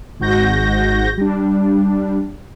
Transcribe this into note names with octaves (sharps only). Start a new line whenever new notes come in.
G#1 G#2 F#4 G6 A#6
G3 D4